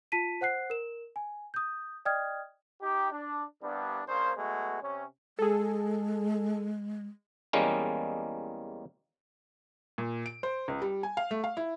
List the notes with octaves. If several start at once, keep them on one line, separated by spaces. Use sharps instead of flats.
F4 A5 B6 D#7
C5 F#5 F#6 C7
A#4 E7
G#5
D#6 G6
D5 D#5 G5 D#6 F6 G#6
D#4 G4
D4
C2 G2 G3 B3 D4
C#3 A#3 D4 C5
F#3 G#3 A3 B3 F#4
C3 C#4
G#3 G#4 A4
E2 G3 G#3 A#3 C#4
A#2
D7
C5
C#2
G3
G#5
F5
A3
F5
E4